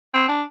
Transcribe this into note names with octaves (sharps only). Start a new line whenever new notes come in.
C4
D4